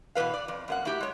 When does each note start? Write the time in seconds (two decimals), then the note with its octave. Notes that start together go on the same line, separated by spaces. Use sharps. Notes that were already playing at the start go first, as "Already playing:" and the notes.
0.15 B2 E3 G3 B4 F5
0.34 D5
0.48 F2
0.68 F#2 A#3 F#5
0.85 A3 E4 F#4 G4
1.00 G#3 C#5